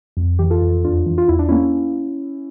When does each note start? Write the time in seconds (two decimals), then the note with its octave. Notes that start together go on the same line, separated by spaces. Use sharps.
0.17 F2
0.39 E3 G4
0.50 F4 A4
0.62 F2
0.84 E2 D4 F4
1.06 E3
1.18 F4
1.28 E2 E4
1.39 D4
1.49 A#3 C#4 E4